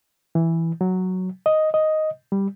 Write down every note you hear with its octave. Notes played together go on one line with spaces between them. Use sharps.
E3
F#3
D#5
D#5
G3